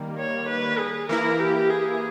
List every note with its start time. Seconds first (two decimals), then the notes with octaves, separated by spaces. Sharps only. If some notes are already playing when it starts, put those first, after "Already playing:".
Already playing: D#3 G3 A#3
0.18 C#5
0.48 B4
0.79 G#4
1.09 E3 A#3 E4 A#4
1.39 G4
1.70 G#4